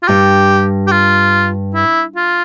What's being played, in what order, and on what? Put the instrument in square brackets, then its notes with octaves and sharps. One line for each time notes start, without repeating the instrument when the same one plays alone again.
[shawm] F4
[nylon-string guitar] G2 [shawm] G4
[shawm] G4
F4
E4
F4